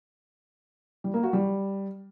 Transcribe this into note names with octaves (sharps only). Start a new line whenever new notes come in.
G3
A#3
F#4
G3